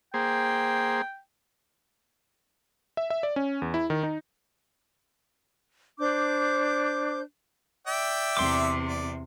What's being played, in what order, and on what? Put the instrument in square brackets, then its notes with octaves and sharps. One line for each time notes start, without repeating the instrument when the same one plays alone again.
[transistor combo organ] A#3 G#4 C5 [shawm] G5
[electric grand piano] E5
E5
D5
C#4
E2
E4
D#3
D#4
[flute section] D4 C5 D6 G6
[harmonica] D5 E5 G5
[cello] E2 C3 [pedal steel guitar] C6 D6
[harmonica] D5